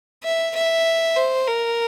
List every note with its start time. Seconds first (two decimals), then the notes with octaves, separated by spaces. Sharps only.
0.24 E5
0.55 E5
1.16 C5
1.48 A#4